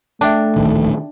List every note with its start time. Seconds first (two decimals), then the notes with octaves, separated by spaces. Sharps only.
0.21 A3 D4 E5 G5 A5
0.56 D1 A#1 D#3